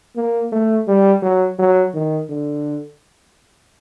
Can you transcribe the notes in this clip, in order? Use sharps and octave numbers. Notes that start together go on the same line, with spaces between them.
A#3
A3
G3
F#3
F#3
D#3
D3